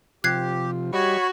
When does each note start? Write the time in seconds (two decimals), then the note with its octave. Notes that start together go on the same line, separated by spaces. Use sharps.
0.24 C3 F3 F4 G4 F#6 G#6 C7
0.93 G3 F#4 G4 C#5 D#5 B5 C#6